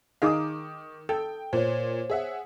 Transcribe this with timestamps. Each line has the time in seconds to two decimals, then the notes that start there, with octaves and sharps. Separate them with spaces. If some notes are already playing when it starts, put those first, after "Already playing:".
0.22 D#3 D#4 G#4 F5 D6 D#6
1.09 A4 G5
1.53 A#2 C5 C#5
2.10 G#4 E5 F#5